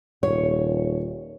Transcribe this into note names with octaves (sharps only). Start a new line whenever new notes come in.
D#1 C#5